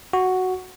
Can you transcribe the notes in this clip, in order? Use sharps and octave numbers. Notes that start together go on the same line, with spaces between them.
F#4